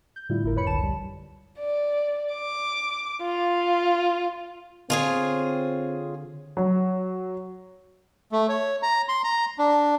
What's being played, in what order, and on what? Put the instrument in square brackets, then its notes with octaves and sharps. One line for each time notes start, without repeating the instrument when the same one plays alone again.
[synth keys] G6
A2 D3 G3 A3 E4 F4
G#1 E4 A#4
G1 F2 B4 C#5 B5 C#7
C#2 F#2 D3 A5 E7
A#1 G3
[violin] D5
D6
F4
[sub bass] D3 [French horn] C4 [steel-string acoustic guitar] F4 G#4 C#5
[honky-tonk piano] F#3
[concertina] A3
C#5
A#5
C6
A#5
D4